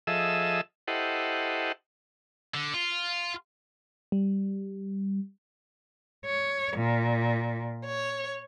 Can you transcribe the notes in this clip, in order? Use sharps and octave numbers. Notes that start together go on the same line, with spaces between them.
F3 G#4 A4 D#5 E5 E6
E4 G4 A4 C5 D#5 F#5
D3
F4
G3
C#5
A#2
C#5